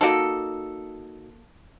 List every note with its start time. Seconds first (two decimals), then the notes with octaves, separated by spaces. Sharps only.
0.01 A#3 D#4 F#4 A4